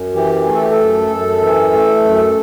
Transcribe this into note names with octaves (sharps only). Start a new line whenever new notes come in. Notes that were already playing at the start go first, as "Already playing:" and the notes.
Already playing: F#2
E3 G4
A3
A4
G4
A4
F#2
F#2
E3
A3
F#2